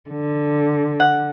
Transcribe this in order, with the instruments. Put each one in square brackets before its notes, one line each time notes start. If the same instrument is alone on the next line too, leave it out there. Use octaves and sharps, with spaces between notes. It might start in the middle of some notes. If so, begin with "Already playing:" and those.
[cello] D3
[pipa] F#5